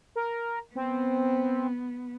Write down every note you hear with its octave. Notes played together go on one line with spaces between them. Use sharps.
A#4
B3 C4